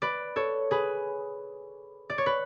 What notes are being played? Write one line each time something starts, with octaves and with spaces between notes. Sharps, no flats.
B4 D5
A4 C#5
G#4 B4
D5
C#5
B4